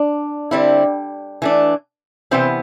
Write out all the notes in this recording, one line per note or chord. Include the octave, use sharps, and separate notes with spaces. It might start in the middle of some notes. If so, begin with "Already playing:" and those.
Already playing: D4
D3 G3 C4 E4
E3 A3 D4
C3 E3 B3 C4 E4 C5